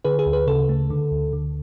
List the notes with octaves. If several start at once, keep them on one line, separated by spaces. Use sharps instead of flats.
D3 G#4 B4
G#4
D2
G#4 B4
C#3 A4
A3
D3
D2
D3